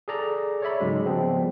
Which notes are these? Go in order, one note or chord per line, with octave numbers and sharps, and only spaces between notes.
G#4 A4 D5 A#5
C#5 D5 E5 B5
G#2 C#3 F#3 G#3
C#3 F3 G3 B3 C4